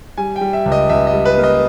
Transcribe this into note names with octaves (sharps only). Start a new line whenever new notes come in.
G3 G#5
G5
G3
E5
C#2
D#5
C#2 E5
D#5
G3
B4
A#3
D#5